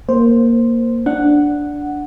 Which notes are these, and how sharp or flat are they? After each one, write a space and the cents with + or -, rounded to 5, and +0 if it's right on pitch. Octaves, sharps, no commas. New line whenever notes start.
A#3 +0 C5 +0
D4 -5 F#5 +0